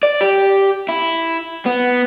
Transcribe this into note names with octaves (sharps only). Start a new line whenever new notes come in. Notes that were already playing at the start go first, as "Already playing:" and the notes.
D5
G4
E4
B3